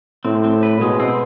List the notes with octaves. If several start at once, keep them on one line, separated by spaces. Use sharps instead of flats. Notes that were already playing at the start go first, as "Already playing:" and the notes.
A2 C4
C4
B4
B2 G#3
C4